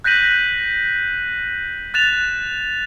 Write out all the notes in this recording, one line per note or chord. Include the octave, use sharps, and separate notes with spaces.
F#6 G6 A#6 B6 D#7 F#7
F#6 A6 E7 F7